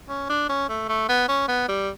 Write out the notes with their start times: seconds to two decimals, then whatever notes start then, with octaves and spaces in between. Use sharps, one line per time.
0.09 C#4
0.29 D4
0.49 C#4
0.69 A3
0.89 A3
1.09 B3
1.28 C#4
1.48 B3
1.68 G3